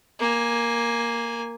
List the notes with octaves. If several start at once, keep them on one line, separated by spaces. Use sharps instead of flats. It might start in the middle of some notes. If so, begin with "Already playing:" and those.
A#3 G#5